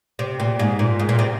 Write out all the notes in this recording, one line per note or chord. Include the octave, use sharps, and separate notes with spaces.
C3
A#2
G#2
A#2
G#2
A#2
C3